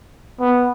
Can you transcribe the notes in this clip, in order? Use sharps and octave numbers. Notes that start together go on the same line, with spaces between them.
B3